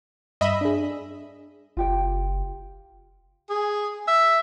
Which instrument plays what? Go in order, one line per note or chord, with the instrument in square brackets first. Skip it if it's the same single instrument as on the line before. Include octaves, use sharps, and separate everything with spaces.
[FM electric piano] G2 [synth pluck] D#5 E5 B5
[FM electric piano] D4 G#4
[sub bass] F#1 [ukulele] F4 G4 G5
[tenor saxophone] G#4
E5